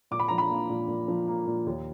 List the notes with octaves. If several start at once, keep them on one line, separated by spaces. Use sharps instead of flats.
A#2 D6
B5
F3 A#5
B5
A#3
A#2
A#2
F3
A#3
A#2
D#2